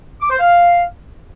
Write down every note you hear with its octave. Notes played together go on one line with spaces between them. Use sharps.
D6
C5
F5